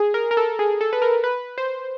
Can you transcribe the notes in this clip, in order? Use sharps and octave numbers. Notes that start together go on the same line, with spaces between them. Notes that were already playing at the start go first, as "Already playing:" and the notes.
Already playing: G#4
A#4
A#4
A4
G#4
A4
B4
A#4
B4
C5